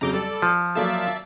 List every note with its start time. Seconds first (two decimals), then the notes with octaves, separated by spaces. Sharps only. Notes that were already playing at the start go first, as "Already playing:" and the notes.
0.01 F2 C#3 F#3 A#5 D6 G6
0.13 G3 A4 D5
0.42 F3
0.75 F#3 A#3 F4 D5 E5 A5